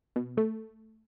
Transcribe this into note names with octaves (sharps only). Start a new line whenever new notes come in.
B2
A3